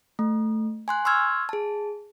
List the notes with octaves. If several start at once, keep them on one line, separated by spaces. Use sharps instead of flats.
A3
G#5 C6 F#6
C6 C#6 E6 F6 G#6
G#4 A5